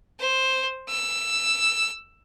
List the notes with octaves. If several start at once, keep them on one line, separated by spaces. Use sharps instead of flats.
C5
E6